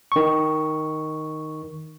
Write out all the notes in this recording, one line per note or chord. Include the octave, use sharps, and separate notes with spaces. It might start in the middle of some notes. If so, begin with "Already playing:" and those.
D#3 C#6